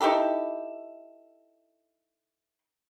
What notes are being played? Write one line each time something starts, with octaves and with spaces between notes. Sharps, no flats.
D#4 E4 G4 A4